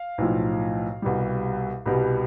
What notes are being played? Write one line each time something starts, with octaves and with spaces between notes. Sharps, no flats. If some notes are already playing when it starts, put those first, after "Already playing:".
Already playing: F5
B1 A2 F3
C2 B2 G3
C2 B2 G3